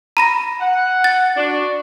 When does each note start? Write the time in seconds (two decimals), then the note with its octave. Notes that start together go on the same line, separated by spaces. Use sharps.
0.17 A#5 B5 A#6
0.60 F#5
1.04 A6
1.37 D4 F#4